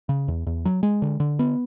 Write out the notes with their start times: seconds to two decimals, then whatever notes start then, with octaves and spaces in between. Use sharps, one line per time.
0.09 C#3
0.28 E2
0.47 E2
0.65 F#3
0.83 G#3
1.02 D3
1.20 D3
1.39 B3